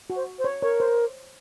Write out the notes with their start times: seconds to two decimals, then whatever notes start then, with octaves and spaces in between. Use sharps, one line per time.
0.10 F#4
0.16 C5
0.39 C5
0.44 C#5
0.62 A#4 C#5
0.80 C5